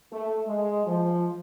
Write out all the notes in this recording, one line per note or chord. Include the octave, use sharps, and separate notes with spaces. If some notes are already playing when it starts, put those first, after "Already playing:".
A3
G#3
F3